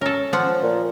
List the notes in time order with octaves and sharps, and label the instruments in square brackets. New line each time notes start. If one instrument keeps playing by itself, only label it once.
[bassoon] C#4 [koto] A4 A#4
[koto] F3 F#5
[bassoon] A#2